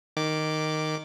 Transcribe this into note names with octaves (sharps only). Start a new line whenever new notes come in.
D#3 D6